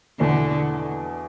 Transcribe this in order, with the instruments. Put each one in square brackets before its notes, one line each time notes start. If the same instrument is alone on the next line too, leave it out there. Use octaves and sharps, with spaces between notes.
[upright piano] E2 B2 A3 [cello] D3